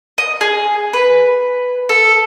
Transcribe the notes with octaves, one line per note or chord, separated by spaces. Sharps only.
D#5
G#4
B4
A4